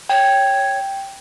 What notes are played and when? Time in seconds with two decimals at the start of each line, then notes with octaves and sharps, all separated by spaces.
0.09 C#5 G5